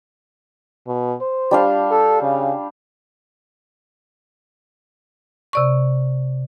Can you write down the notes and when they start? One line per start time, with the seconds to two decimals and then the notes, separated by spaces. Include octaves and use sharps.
0.87 B2
1.21 C5
1.51 G3 D4 F5
1.91 A4
2.22 C#3
5.53 C3 D5 C#6